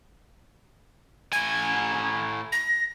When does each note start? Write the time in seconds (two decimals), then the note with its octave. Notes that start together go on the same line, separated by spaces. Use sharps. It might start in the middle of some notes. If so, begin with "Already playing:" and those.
1.33 A2 G#5 G#6
2.52 A#6